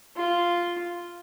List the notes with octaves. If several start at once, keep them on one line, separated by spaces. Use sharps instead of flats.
F4